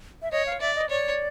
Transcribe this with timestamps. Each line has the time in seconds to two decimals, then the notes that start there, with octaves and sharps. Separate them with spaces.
0.22 E5
0.32 C#5 D#5
0.46 F5
0.61 D5 E5
0.75 D#5
0.90 C#5 D5